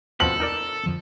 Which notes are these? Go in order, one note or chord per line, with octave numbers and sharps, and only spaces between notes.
B2 F3 C4 A4 F#7
D#4 A#4 D5
F2 D3 F3